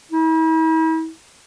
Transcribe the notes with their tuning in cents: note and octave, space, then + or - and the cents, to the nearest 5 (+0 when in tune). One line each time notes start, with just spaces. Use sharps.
E4 -45